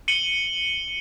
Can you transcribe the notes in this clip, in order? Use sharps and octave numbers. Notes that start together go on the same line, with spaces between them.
C#7 D#7 F#7 G7